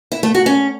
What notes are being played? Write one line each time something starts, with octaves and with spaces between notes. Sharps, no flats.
E4
A3
F#4
C#4